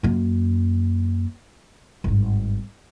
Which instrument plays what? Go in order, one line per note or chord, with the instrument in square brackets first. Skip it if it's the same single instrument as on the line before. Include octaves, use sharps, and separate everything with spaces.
[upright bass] F#2 A#3
G#1 G2